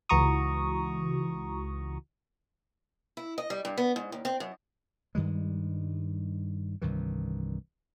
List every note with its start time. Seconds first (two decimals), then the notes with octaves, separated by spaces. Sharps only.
0.09 C#2 E3 F#4 A#5 C#6 D#6
3.17 E4
3.38 D#5
3.50 G3
3.65 G2
3.78 B3
3.96 G#2
4.12 D#2
4.25 C4
4.40 F#2
5.15 G2 D#3 G3 G#3
6.82 C2 G2 D#3 E3